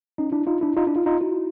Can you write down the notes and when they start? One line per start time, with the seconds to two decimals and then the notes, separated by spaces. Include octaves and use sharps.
0.18 C#4 D#4
0.32 D4 E4
0.47 D#4 F4
0.61 D4 E4
0.76 D#4 F4
0.87 D4 E4
0.96 D#4 F4
1.06 D#4 F4
1.21 E4 F#4